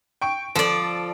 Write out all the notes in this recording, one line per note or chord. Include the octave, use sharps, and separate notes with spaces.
G5 C#6 D7
F3 A4 D5